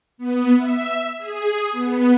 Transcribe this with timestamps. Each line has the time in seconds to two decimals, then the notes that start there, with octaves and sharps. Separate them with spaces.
0.18 B3
0.56 E5
1.18 G#4
1.72 B3